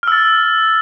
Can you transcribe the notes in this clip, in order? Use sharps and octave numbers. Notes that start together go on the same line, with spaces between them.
E6 F6 A6